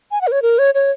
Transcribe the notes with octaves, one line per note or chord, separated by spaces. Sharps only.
G#5
F#5
A#4
C#5
A#4
C#5
C#5